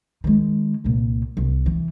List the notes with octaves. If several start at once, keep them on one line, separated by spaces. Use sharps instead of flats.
D#3 G#3
C2 A#2
C2
E3